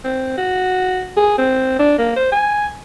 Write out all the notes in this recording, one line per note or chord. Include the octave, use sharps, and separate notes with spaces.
C4
F#4
G#4
C4
D4
A#3
C5
G#5